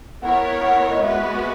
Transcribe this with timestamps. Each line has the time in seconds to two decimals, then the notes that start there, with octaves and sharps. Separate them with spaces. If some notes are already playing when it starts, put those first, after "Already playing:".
0.22 B3 E4 A#4 C#5 F#5
0.61 F#5
0.90 D#5
1.01 G#3 B3 F#4 B4 E5